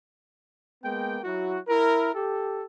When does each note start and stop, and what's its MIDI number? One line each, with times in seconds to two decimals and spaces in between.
0.84 1.19 56
0.84 1.19 58
0.84 1.19 59
0.84 1.19 79
1.24 1.58 54
1.24 1.58 64
1.24 1.58 66
1.69 2.10 64
1.69 2.10 70
2.14 2.65 67
2.14 2.65 69